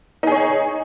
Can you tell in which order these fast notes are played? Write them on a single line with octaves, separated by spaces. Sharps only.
D#4 G#4 C#5